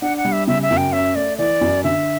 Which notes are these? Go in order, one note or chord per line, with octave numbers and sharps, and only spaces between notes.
D4 F#5
F#5
G3
E5
C#3 E5
E5
F#2
G5
C#4 E5
A3 D5
E3 D5
F#2
D3 E5